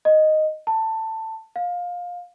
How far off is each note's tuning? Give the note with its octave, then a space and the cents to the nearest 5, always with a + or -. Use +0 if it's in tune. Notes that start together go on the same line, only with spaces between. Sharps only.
D#5 -5
A5 +15
F5 +20